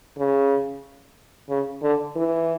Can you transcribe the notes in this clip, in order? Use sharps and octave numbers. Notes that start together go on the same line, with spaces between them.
C#3
C#3
D3
E3